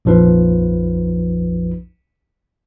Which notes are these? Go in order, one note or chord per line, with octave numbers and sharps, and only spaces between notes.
A#1 F2 F3 D#4 B4